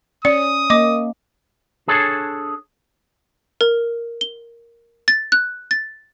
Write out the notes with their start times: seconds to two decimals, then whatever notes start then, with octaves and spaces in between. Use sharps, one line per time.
0.25 C#4 D5 D#6 C#7
0.70 A#3 D#5 D6
1.88 D4 G#4 A4 C#5
3.61 A#4
4.21 G7
5.08 A6
5.32 F#6
5.71 A6